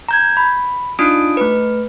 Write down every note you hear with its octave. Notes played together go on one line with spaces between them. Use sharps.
A#5 G6 G#6
B5
D4 D#4 F4 D#6 D7
A3 B4